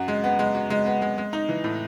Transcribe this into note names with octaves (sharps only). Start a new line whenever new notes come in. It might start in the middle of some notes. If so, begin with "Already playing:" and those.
Already playing: F#2 F#4
G#3
B3
G#3
F#4
G#3
B3
G#3
G#3
D#4
E3
A2